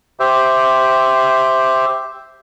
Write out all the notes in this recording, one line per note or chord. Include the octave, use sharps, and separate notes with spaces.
G4 C5 E5